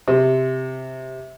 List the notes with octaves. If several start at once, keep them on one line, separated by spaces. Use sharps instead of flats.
C3